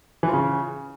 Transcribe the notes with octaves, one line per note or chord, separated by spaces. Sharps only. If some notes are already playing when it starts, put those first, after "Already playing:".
E3
F4
C#3